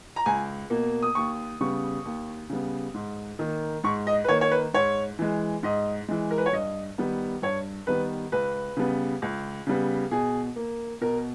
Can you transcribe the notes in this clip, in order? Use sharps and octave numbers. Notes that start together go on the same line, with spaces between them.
A#5
C#2 G#5
B2 A#3
D#6
D#2 C#6
C#3 G3 B3 C#6
D#2
C#3 G3 B3
G#2
D#3 A#3
G#2 C#6
D#5
B4
D#3 A#3 C#5
C#5
B4
G#2 C#5
E3 G#3
G#2 D#5
E3 G#3
A#4
B4
C#5
G2 D#5
D#3 G3 B3
G2 C#5
D#3 G3 B3 B4
C#2 B4
C#3 G3 B3
C#2
C#3 G3 B3
B2 G#4
A#3
B2 A#4